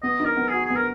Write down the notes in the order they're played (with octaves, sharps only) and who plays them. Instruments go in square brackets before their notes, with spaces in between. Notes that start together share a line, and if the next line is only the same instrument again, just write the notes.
[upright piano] B3 [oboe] D#5
[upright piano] D#4 [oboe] A#4
[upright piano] B3
[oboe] G#4
[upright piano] F#4
[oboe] G#4
[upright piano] B3
[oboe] A#4